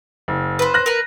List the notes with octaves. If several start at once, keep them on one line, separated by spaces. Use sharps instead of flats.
F#1
B4 C5
F#6 A#6
A#4 B4